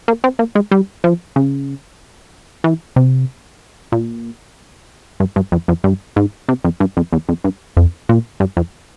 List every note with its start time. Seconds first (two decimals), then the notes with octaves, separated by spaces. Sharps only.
0.08 A#3
0.24 C4
0.39 A#3
0.55 G#3
0.71 G3
1.04 F3
1.36 C#3
2.64 E3
2.96 C3
3.92 A#2
5.20 G2
5.36 G2
5.52 F2
5.68 F2
5.84 G2
6.16 G#2
6.49 C3
6.64 F2
6.80 G2
6.97 F2
7.13 E2
7.29 F2
7.44 G2
7.77 F2
8.09 A#2
8.40 G2
8.57 F2